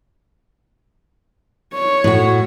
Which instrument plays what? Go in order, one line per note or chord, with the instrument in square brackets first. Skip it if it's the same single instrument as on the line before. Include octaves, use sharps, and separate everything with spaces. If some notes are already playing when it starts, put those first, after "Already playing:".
[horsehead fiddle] C#5
[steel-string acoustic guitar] A2 F#4